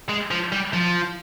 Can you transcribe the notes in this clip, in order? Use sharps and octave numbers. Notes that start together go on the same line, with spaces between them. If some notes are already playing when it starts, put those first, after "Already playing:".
G#3
F3
G3
F3